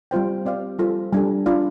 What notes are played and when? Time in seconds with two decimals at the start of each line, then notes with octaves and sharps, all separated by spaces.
0.11 G3 C4 F4 C5 G5
0.46 C4 G4 D5 F5
0.79 G3 F4 A4 C5
1.13 G3 D4 A4
1.46 D4 F4 D5 F5